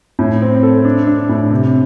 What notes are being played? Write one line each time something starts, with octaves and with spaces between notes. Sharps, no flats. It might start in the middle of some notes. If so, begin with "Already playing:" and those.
A2
C4
A4
D4
D4
A2
C3